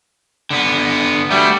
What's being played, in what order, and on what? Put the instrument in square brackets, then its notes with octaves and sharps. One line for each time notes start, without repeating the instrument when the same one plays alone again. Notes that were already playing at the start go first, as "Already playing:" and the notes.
[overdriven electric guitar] D3 B3
[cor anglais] G3 [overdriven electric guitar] A3 F#4